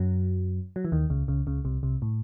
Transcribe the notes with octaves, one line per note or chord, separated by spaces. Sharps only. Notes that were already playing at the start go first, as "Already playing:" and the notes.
Already playing: F#2 F#3
F#3
E3
D#2 D#3
C#2 C#3
C#2 C#3
C#2 C#3
C2 C3
C2 C3
A2